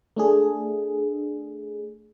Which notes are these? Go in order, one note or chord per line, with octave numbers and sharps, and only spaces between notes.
A3 D4 G#4